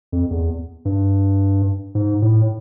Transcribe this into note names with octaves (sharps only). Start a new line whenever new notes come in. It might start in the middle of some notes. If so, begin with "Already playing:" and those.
F2
E2
G2
G#2
A2